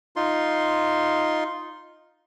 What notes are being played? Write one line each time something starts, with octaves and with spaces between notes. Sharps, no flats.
D#4 F4 C6